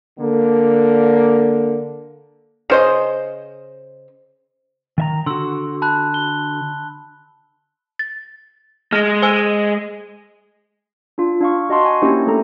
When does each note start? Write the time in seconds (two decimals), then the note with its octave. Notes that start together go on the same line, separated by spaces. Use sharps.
0.19 D3 A#3
2.70 C#3 C5 D#5
4.98 D#3 E5 A#5
5.26 D3 F#4 C6 E6
5.82 A5 B5 F#6
6.14 G7
7.99 A6
8.93 G#3 F6 A#6
9.22 C5 G#5 E6
11.18 D4 F4
11.41 D4 F5 C#6
11.70 F#4 D#5 F#5 A5 C6 C#6
11.85 G#5
12.02 A#3 C#4 D4 E4 G4 C5
12.27 A3 A4 A#5